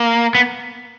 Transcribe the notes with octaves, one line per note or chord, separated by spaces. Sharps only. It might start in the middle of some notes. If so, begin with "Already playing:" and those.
Already playing: A#3
B3